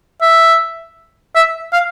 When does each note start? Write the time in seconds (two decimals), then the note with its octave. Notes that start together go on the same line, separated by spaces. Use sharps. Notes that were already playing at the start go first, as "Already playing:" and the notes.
0.22 E5
1.36 E5
1.73 F5